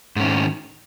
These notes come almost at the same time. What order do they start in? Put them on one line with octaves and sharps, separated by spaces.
G#2 C#4 D#3